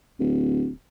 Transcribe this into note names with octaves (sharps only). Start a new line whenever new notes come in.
D1